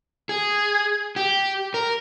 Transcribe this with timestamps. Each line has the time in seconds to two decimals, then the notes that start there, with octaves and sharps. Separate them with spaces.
0.29 G#4
1.16 G4
1.74 A#4